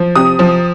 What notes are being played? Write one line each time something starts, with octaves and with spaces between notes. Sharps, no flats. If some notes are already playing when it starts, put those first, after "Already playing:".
Already playing: F3
C3 D#6
F3